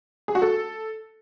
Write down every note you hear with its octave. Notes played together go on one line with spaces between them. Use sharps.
G#4
F#4
A4